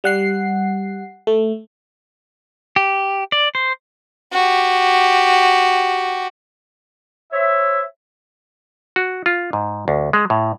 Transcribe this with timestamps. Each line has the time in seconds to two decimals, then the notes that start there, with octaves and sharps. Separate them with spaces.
0.04 G3 F#5 C7
1.27 A3
2.76 G4
3.32 D5
3.55 C5
4.32 F#4 G4
7.32 C5 C#5 E5
8.96 F#4
9.26 F4
9.53 G#2
9.88 D2
10.13 G#3
10.30 A2